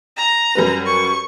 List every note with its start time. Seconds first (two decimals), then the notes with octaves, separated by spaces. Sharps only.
0.17 A#5
0.55 F#2 G3 B4
0.86 C#6